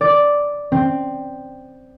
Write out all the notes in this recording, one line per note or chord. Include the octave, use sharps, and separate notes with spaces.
D5
C4